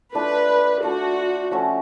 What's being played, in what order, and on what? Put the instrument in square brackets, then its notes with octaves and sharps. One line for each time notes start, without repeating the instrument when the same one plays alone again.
[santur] A3 D4 F4 [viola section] B4
[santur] A3 D4 F4 [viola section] F#4
[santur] F3 A3 C#4 F#4